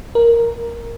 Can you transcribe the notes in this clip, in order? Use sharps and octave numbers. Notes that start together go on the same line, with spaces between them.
A#4